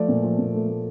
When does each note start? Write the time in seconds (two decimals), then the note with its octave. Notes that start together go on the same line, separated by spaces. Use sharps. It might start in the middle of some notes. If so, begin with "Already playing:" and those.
Already playing: F3 A3 D5
0.08 A#2
0.23 F3
0.39 A#2
0.54 A3
0.69 A3